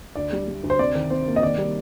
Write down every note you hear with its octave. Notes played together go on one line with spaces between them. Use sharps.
D2 D5
G3
G3
D2
C5
C3 D5
D#3
C3 C5
A#3
D#5
D#3 D5
G3